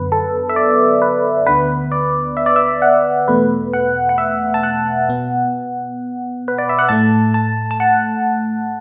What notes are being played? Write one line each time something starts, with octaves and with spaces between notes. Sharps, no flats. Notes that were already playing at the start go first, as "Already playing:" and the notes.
Already playing: F#2 D3 B3 B4
A4
E5
D5
B4
D2 D3 B3 B4
D5
E5
D5
E5
F#5
E2 B2 A3 B4
F#5
F#5
E5
A5
F#5
B2 B3
B4
D5
E5
F#5
A2 A3 A5
A5
A5
F#5